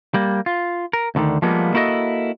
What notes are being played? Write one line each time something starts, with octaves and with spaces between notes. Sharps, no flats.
G3 A#3
F4
A#4
D2 B2 D3 D#3
F3 G3 G#3 A#3 B3
A#3 E4 F#4 A4 B4 D#5